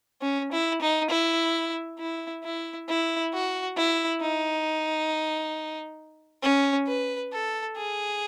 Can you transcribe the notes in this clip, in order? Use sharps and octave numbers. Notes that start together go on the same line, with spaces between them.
C#4
E4
D#4
E4
E4
E4
E4
F#4
E4
D#4
C#4
B4
A4
G#4